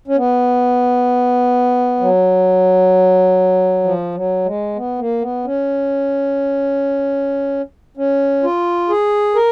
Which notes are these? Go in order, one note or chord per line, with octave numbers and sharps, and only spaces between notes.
C#4
B3
F#3
F3
F#3
G#3
B3
A#3
B3
C#4
C#4
F4
G#4
A#4